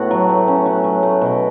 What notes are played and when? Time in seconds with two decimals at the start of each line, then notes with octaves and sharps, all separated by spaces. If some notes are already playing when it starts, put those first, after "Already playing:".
Already playing: A2 A3 B3 F#4
0.11 F#3
0.29 A3
0.48 C#4
0.66 F#3
0.84 F#3
1.03 A3
1.22 B2